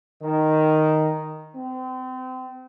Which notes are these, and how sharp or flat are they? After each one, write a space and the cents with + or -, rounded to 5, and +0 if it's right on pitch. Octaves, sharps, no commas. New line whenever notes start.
D#3 +0
C4 -30